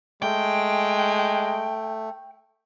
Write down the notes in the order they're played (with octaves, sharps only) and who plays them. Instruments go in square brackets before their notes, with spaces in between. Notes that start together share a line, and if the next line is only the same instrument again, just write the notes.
[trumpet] G#3 [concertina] A3 [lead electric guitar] G5